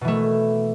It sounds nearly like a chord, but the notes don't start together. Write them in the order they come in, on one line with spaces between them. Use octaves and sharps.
B2 E3 A3